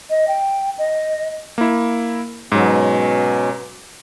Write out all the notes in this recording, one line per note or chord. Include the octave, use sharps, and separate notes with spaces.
D#5
G5
D#5
A#3 E4
G#2 B2 F#3 C#4